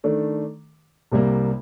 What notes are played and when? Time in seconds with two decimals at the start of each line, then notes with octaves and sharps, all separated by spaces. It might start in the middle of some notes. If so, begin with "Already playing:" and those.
0.04 D#3 A3 D4 A4
1.12 C2 C3 G3 A#3